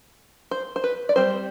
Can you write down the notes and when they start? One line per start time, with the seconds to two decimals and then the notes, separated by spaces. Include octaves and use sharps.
0.51 C5
0.76 C5
0.84 B4
1.09 D5
1.16 G3 C4 C5